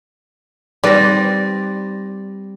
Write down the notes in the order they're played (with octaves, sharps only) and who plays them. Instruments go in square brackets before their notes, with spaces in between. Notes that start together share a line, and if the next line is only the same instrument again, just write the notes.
[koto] G3 C4 [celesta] D#4 A6 A#6 [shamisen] B4 D5